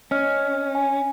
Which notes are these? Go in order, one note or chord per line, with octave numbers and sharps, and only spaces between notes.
C#4 D#5 F6
G#5